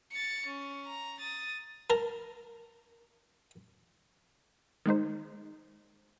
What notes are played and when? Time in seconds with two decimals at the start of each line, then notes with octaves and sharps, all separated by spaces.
0.12 A6 C#7
0.46 C#4
0.86 A#5
1.20 D#6 A6
1.90 A#4 A5 A#5
4.86 D#3 G#3 D#4 C5